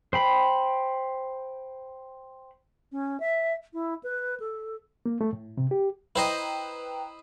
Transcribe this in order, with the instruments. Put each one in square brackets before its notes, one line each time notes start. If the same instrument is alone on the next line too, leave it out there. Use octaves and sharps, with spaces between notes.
[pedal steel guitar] C5 G5 B5
[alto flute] C#4
E5
E4
B4
A4
[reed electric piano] A#3
A3
A2
C3
G4
[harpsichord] E4 C5 D#5 [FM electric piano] B4 G5 A#5